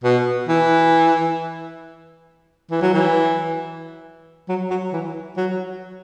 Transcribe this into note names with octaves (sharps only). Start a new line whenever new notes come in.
B2
E3
E3
F#3
E3
F#3
F#3
E3
F#3